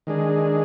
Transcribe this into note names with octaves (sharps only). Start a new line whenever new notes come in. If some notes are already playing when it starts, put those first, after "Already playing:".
D#3 G#3 D4 G#4